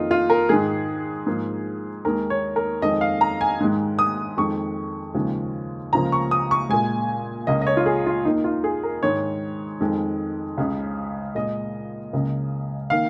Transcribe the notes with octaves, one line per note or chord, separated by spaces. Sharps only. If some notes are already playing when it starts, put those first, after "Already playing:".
Already playing: F2 D#3 A#3 D#4 F4
F4
A#4
G#2 D#3 G#3 G#4
G#2 F3 A#3
D#2 D#3 G#3 A#4
C#5
A#4
F2 D#3 G#3 D#5
F5
A#5
G#5
G#2 D#3 G#3
D#6
F2 D#3 G#3 C#6
D#2 C#3 F3 G#3
C#2 C#3 F3 A#3 A#5
C#6
D#6
C#6
A#2 G#3 G#5
C#2 C#3 A#3 D#5
D#5
C#5
F4
G#4
F4
D#2 D#3 A#3 D#4
F4
G#4
A#4
G#2 D#3 G#3 C#5
F2 D#3 G#3
C#2 C#3 G#3
A#2 G#3 D#5
C#2 C#3 A#3
D#3 A#3 F5